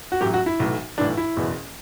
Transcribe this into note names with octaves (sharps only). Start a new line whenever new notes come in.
F#4
A1 A2 F#3 G4
F#4
E4
B1 A2 E3
B1 A2 E3 D4
E4
F#1 E2 B2